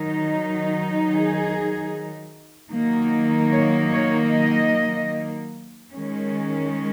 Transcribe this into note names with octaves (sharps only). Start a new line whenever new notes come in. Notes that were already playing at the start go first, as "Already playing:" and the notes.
Already playing: D#3 F#3 D#4
G#4
D#3 F#3 A#3 D#4
C#5
C#5
D#5
D#3 G#3 C#4